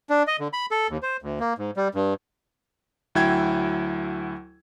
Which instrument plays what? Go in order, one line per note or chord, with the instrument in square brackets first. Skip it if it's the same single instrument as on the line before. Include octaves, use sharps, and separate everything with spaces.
[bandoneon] D4
D#5
D3
B5
A4
D#2
C5
D2
A#3
G#2
G3
G2
[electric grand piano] D2 F#3 E4 G5 G#6